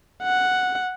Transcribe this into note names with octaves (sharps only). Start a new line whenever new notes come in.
F#5